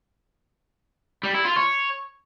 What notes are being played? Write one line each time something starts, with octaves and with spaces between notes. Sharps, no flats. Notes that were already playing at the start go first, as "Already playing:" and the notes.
G3
E4
F4
C#5